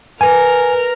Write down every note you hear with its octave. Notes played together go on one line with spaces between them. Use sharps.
A#4 B4 G#5